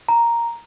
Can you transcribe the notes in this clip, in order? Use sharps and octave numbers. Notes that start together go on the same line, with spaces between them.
A#5